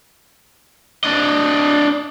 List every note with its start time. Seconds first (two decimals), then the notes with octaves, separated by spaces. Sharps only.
1.04 D4 D#5